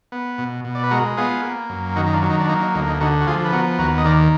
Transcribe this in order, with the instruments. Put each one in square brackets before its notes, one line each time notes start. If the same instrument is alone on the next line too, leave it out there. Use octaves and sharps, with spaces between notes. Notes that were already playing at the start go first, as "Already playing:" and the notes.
[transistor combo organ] B3
B2
B2
D5
B4
G#3 F#4 A#4
B3 F4 G#4
A#3
F#2
D#3 D#4 F#4
D#4
D4 F4
F#3
D#4
D4
A#3 D#4
D#4
D2 D#4
D#4
D3 D#4 F#4
F#4
F3 F4 G#4
B4
B3 F#4 A#4
D#2 F#4 A#4
D#5
D#3 A#4 D5